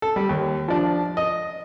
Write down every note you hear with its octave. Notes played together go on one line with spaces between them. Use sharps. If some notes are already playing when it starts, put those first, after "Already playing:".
A4
G3
D#2
F3 D4
D#5